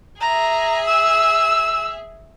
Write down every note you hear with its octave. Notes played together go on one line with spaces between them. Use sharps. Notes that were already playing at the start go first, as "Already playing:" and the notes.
G#4 E5 A#5
E6